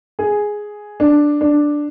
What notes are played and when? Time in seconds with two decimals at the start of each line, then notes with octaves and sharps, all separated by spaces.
0.19 G#4
1.00 D4
1.41 D4